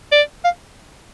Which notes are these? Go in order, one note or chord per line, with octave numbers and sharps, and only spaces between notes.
D5
F5